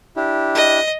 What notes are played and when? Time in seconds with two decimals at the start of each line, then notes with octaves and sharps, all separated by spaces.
0.16 D4 E4 G4
0.55 D#5